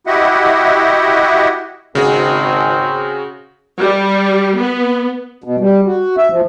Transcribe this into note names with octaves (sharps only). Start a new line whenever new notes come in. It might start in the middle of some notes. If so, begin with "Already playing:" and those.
E4 F#4 G4 D#5 E5 F#5
G#1 C#3 C4 F#4 G#4
G3
B3
B2
G3
F#4
E5
F3